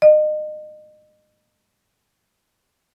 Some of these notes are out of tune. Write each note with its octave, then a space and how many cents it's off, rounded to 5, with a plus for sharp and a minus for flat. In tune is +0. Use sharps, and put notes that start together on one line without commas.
D#5 -30